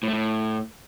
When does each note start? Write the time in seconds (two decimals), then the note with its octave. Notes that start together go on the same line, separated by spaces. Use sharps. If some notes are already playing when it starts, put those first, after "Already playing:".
0.03 A2
0.08 A3
0.13 A2